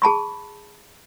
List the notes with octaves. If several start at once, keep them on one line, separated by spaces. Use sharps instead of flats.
G#4 A5 B5 C#6